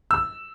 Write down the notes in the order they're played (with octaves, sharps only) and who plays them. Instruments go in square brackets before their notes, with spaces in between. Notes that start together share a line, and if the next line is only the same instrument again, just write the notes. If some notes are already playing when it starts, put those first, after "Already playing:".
[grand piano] E6